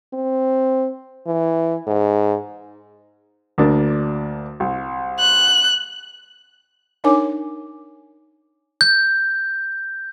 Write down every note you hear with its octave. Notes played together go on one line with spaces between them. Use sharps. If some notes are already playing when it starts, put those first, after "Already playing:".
C4
E3
G#2
D2 A#3 D4
C2
F#6
D4 D#4 A#4 C#5 G#5 D6
G6